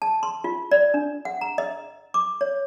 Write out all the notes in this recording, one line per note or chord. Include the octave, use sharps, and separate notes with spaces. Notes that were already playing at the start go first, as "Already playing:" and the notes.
A5
C6
F4
D5
D4
F#5
A#5
D#5
D6
C#5